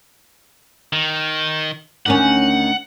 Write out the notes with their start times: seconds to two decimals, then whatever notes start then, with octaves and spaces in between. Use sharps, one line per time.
0.93 D#3
2.06 D2 D#3 C#4 F#5